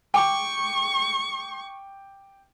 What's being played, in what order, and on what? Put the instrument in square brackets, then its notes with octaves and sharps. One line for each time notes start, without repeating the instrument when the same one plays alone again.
[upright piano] G5 D6 [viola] C#6